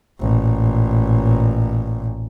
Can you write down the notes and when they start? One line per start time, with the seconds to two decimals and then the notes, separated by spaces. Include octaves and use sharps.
0.21 A1 A#2